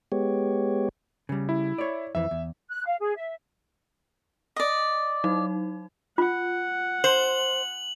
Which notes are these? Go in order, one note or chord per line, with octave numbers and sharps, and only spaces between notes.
G#3 B3 G4 C#5
C#3 G3
E4
C#5 D5
F2 E3 E5
E2
F#6
F5
G#4
E5
D5 D#5
F#3 D#4
F4 F#5
C5 F#7